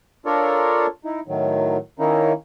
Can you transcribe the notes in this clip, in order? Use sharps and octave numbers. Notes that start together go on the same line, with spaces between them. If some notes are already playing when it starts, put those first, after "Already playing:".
D4 F4 A4 A#4 C#5 D5
D#4 E4
A2 D#3 F#3
D#3 A#3 C#4 D#4 E4